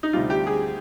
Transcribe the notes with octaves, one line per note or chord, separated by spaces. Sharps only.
D#4
D2 C3 G3 F4
G4
G#4